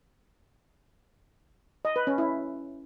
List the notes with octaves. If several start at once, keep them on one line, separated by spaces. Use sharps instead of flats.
D#5
B4
C#4
E4